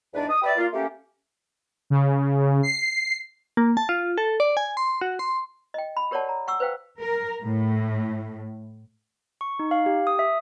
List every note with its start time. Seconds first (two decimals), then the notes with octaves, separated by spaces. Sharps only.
0.14 E2 G#2 D4 B4 D5
0.29 D#6
0.42 G4 B4 D5 E5
0.57 A#3 F4
0.73 A3 A#3 C#4 G4
1.90 C#3
2.63 C7
3.57 A#3
3.77 A5
3.89 F4
4.18 A4
4.40 D5
4.57 G#5
4.77 C6
5.01 F#4
5.19 C6
5.74 D#5 G5
5.97 B5
6.11 G4 A#4 C#5 D5 F#5 A5
6.25 F#5 A#5
6.48 F#5 C#6 E6
6.60 B4 C5 F5 G5
6.99 A#4
7.42 A2
9.41 C#6
9.59 D#4
9.71 F5
9.86 G4
10.07 D#6
10.19 E5